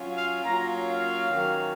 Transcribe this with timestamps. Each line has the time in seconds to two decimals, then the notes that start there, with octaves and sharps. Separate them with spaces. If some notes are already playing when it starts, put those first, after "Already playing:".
Already playing: F#3 C#4 F4
0.16 F5
0.43 F#3 A#3 C#4 F4 A#5
0.86 F5
1.28 D#3 F#3 A#3 C#4